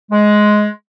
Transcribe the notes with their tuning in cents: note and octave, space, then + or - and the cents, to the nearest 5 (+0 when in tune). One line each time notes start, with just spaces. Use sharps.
G#3 +10